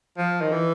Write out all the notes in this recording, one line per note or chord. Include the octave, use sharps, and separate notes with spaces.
F3
D#3
E3